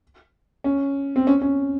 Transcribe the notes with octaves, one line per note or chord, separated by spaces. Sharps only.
C#4
C4
C#4
C#4